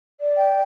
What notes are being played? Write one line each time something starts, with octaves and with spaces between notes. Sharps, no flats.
D5
G5